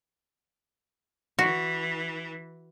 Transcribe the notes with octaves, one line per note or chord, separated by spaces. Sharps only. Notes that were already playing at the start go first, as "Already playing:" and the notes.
E3 F#4